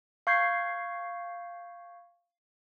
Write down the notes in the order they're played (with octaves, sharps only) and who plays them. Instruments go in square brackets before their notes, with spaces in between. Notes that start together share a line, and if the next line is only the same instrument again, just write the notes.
[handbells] F5 C#6 G6 G#6 C7